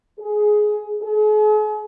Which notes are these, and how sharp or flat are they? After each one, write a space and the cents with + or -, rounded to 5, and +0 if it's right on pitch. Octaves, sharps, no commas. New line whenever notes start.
G#4 +15
G#4 +45